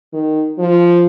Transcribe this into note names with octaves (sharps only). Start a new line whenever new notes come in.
D#3
F3